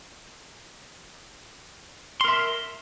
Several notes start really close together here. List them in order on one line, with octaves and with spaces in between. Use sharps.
C6 A#4 E5